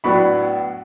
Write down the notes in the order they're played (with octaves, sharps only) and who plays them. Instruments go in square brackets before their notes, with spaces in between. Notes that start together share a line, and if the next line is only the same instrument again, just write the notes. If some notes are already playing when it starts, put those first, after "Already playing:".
[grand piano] A2 F#3 B3 D4 B5 C#6